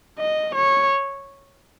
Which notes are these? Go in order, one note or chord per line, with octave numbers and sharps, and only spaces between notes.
D#5
C#5